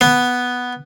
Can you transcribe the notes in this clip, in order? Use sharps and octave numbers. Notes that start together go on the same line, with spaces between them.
B3